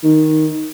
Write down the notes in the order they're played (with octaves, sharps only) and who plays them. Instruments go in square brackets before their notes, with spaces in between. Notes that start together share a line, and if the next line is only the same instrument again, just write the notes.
[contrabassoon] D#3